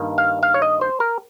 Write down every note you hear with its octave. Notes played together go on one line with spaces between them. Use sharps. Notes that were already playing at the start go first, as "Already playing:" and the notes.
Already playing: G2 D#3 A#3
F5
F5
C#5
D#5
C5
A#4